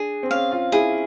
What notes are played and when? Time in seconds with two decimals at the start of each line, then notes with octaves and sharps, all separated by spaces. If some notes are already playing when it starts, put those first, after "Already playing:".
Already playing: D4 G#4
0.23 C4
0.30 C#4 F5
0.51 F4
0.72 E4 G#4